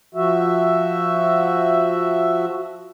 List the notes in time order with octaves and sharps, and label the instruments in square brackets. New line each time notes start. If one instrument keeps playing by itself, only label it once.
[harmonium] F3 F#4 E5